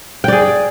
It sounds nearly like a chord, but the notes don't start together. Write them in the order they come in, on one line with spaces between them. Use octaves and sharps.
G5 D5 G#4